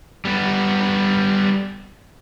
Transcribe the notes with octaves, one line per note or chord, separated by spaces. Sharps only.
G3 B3